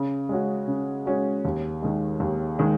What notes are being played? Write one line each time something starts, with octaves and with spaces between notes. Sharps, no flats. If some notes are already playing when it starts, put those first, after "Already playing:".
Already playing: C#3
G#3 C#4 F#4
C#3
G#3 C#4 F#4
D#2
D#3 G#3
D#2
D#3 G#3